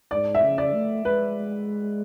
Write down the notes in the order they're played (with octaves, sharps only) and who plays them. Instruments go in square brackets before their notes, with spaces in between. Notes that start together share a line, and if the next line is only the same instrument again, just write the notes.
[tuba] G#2 [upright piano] D5
[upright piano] E5
[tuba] C#3
[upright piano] D5
[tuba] A3
[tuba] G#3 [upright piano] B4